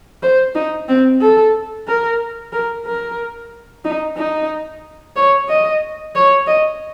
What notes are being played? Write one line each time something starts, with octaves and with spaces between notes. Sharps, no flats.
C5
D#4
C4
A4
A#4
A#4
A#4
D#4
D#4
C#5
D#5
C#5
D#5